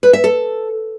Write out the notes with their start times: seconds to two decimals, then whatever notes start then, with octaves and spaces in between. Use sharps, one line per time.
0.03 B4
0.13 E5
0.24 A4